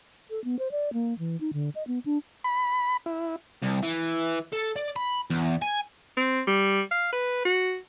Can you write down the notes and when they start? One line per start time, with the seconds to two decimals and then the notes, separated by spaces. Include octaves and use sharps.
0.30 A4
0.44 B3
0.59 C5
0.71 D5
0.93 A#3
1.19 E3
1.41 D#4
1.53 D3
1.75 D#5
1.87 B3
2.06 D4
2.44 B5
3.06 E4
3.63 C2
3.83 E3
4.53 A4
4.76 D5
4.96 B5
5.30 E2
5.62 G#5
6.17 C4
6.47 G3
6.91 F5
7.13 B4
7.45 F#4